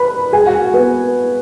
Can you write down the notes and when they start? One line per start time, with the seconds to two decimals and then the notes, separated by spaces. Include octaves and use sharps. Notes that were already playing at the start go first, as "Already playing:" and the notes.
Already playing: B4 B5
0.33 G#4 G#5
0.46 F#4 F#5
0.74 B3 B4